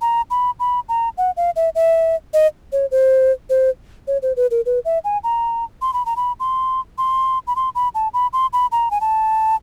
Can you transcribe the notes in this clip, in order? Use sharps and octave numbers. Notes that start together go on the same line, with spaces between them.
A#5
B5
B5
A#5
F#5
F5
E5
E5
D#5
C#5
C5
C5
C#5
C5
B4
A#4
B4
E5
G#5
A#5
C6
B5
A#5
B5
C6
C6
B5
C6
B5
A5
B5
C6
B5
A#5
G#5
A5